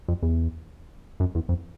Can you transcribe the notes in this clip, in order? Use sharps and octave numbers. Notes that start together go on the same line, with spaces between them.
F2
E2
F#2
E2
F2